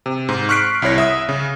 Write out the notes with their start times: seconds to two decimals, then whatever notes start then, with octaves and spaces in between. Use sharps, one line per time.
0.06 C3
0.29 G#2
0.49 C#6 F6 F#6 B6 C7 D7
0.82 C2 E4 C#5 A#6
0.98 E5 D#6
1.29 C#3